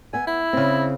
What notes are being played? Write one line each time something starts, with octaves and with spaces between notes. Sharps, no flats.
B3 E5 G#5
E4
C#3 C4